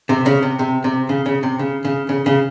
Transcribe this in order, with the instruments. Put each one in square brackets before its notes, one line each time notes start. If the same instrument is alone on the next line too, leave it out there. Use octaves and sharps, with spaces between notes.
[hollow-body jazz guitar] C3
C#3
C3
C3
C3
C#3
C#3
C3
C#3
C#3
C#3
C#3